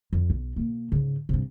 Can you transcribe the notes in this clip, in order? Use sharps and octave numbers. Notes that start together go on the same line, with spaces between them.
F2
B1
B2 A#3
G#2 C#3
G2 C3